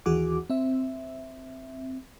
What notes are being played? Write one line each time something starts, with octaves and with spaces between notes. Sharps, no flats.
D#2 E3 F#4 G#4 F#5 D6
C4 E5